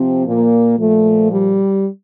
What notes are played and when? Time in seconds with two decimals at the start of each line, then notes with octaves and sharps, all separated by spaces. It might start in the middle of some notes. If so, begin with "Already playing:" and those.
Already playing: C3 F3 C4
0.25 A#2 A#3
0.78 A#2 F3 A3
1.30 G3